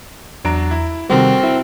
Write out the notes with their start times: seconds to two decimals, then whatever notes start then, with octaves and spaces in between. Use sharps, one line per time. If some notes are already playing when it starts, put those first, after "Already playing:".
0.45 E2 F#3 D4 A#5 D7
0.71 E4
1.10 C3 D#3 G3 C4 F#4 A4 A#4
1.43 E4